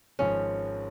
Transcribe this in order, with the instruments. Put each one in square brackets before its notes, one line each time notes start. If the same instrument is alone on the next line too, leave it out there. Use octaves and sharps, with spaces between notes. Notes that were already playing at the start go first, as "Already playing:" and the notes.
[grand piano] G#1 G#2 F3 G#3 [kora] C#4